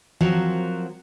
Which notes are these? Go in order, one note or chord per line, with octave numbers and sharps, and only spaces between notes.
F3 F#3 C4 F#4 A#4